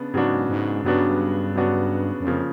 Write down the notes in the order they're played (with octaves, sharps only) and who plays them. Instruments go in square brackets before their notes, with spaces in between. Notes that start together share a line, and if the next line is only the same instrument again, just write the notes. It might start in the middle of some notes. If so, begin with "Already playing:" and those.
Already playing: [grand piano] C#3 B3 D4
[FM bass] G#2 [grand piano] C#3 F#3 B3 D4 F#4
[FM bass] G#2
[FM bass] G2 [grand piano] C#3 F#3 B3 D4 F#4
[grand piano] C#3 F#3 B3 D4 F#4
[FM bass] F#2
[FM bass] F2 [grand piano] C#3 F3 A#3